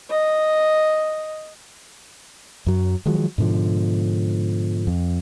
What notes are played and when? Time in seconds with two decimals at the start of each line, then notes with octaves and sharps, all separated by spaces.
0.11 D#5
2.66 F#2 F#3
3.06 D#3 F3 F#3 G#3
3.38 G#2 B2 D3 F3
4.87 F2